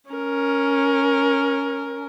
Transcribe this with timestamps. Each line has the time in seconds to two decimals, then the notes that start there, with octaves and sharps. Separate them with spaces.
0.10 C#4 A#4